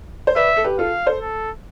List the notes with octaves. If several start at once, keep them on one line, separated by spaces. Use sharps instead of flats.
C5
B4 D5 E5
A4
G4 B4
F4 A4 F5
A4 C5
A4